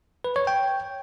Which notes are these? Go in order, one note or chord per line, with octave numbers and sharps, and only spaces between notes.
B4
C#5
G5